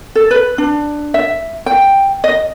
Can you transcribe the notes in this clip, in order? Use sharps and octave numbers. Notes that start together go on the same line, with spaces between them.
A4
B4
D4
E5
G5
D#5